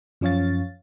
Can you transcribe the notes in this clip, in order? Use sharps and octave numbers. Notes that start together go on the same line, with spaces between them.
F#2 F3 C#4 C#5 F5 A6